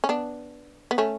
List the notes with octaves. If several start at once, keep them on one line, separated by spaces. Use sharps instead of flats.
C#4
B3 D4
B3
A3 C#4